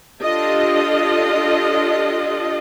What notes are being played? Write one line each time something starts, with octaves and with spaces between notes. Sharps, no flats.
D4 F4 G4 A4 D#5